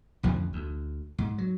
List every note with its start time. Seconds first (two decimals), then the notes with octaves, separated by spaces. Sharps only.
0.23 A1 F2 D3 F3
0.53 D2
1.18 G#2
1.38 F#3